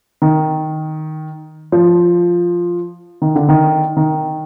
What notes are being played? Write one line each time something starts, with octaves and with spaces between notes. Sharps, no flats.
D#3
F3
D#3
D3
D#3
D#3